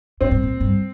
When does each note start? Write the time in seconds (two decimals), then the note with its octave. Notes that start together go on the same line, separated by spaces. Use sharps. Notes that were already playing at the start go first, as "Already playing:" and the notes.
0.21 G2 C4
0.31 G#2
0.43 A#2
0.61 G2